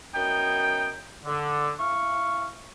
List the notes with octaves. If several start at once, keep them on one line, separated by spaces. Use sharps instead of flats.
F#2 B3 D#4 G5
D3
E4 F5 C#6